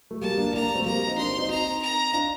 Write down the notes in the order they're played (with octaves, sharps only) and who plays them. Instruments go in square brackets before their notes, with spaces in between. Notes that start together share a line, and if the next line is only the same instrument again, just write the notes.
[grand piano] A3
[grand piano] G3 A#3 [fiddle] A5
[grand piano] A#3 D4
[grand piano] A#3 D4 [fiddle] A#5
[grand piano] A3 C4
[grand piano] G3 A#3 [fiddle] A#5
[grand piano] C4 D#4
[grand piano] A#3 D4 [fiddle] C6
[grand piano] C4 D#4
C4 D#4
[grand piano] C4 D#4 [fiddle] A#5
[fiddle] A#5
[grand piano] D4 F4